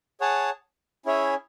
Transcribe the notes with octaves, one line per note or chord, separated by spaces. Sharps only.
G#4 C#5 F#5 A5
C#4 E4 G#4 C#5 E5